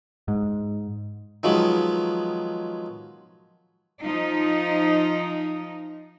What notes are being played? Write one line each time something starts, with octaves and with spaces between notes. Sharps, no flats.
G#2
D#3 F3 F#3 G#3 B3
F3 D#4